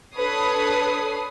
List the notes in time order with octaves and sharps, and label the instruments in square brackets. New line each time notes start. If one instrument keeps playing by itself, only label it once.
[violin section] D4 A4 B4 C#5 D#6 C7